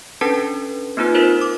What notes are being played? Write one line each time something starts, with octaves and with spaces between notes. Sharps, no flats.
C#4 D4 A4 B4 A5
A#3 C4 D#4 F4 B4
D#4 F4 A#4 C5
D6